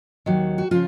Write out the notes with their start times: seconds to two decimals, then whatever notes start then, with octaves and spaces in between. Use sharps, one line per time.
0.26 D#2 D#3 F#3
0.58 F#4
0.71 C#3 F3 F4